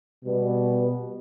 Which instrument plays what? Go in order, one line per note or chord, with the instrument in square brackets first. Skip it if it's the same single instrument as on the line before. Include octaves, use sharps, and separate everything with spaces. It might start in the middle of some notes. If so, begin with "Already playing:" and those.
[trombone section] B2 G3 B3